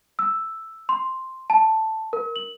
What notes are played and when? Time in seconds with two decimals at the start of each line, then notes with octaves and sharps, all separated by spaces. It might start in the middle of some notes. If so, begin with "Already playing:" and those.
0.19 E6
0.89 C6
1.50 A5
2.13 A#4
2.36 F#7